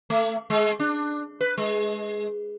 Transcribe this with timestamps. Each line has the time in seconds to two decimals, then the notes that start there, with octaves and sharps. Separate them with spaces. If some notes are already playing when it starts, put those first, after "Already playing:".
0.10 A3
0.50 G#3
0.79 D4
1.41 B4
1.58 G#3